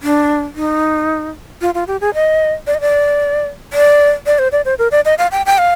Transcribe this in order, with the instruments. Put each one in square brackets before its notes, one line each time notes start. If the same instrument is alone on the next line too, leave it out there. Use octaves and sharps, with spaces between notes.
[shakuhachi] D4
D#4
F4
F4
G4
G#4
D#5
D5
D#5
D5
D5
D5
C5
D5
C5
A#4
D5
D#5
F5
G5
G5
F5